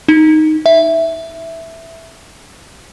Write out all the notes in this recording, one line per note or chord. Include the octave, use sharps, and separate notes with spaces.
D#4
E5